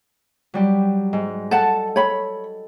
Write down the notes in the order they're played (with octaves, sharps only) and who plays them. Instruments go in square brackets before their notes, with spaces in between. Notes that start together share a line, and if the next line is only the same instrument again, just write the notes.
[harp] F#3 G3 G4
G#2
[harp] A4 [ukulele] F#5 A5
[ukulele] C#5 B5